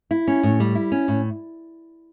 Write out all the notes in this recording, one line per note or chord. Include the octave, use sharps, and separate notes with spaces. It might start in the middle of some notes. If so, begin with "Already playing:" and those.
E4
C#4
A2
G3
E4
C#4
A2